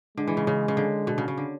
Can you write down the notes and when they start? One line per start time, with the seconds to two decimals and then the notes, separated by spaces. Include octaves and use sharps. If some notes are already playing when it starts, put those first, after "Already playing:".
0.17 D3 G#3
0.28 E3
0.37 C#3
0.47 C#3
0.68 C#3
0.77 D3
1.07 B2
1.18 C#3
1.28 C#3
1.38 D3